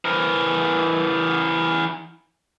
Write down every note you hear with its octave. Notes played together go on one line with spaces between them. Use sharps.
E3 A#4